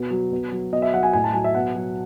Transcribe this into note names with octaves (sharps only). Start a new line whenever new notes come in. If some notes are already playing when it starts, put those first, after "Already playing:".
Already playing: B2
F#3
B2
F#3
B2 D#5
E5
F#3 F#5
G#5
A2 G#5
A5
F#3 G#5
E5
B2 F#5
F#3